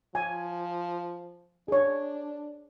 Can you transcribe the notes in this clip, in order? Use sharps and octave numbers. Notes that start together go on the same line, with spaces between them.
F3 G#5
D4 G#4 C#5